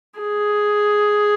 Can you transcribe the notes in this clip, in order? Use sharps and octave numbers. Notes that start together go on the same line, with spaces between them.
G#4